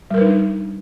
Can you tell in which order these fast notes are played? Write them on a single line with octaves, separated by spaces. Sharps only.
G3 A#4 B4 D#4 D4